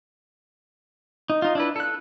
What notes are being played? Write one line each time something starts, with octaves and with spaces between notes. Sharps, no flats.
D#4
D#4 F4
D4 E4 B4
A4 F#6